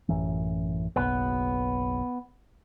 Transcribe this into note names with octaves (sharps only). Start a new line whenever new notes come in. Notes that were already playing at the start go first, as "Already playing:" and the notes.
A1 F#2 E3
F#1 B1 B3